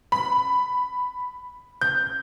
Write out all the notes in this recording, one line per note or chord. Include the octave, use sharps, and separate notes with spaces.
B5
G6